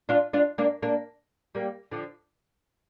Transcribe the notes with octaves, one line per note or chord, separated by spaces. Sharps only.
D4 F4
D4 F4
A#3 D4
A#3 D4
G3 A#3
D3 F3